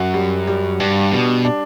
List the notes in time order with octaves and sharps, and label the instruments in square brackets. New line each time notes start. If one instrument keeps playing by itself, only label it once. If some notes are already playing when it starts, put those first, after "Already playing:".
Already playing: [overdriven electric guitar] F#2 [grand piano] F#4
[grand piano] G3
G3
[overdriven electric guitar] G2 [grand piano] D4
[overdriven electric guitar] B2 [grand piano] G3
[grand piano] D4